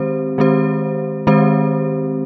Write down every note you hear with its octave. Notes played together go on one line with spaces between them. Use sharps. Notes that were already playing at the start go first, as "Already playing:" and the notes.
Already playing: D#3 G#3 C4 G4 C5
D#3 G#3 C4 G4 C5
D#3 G#3 C4 G4 C5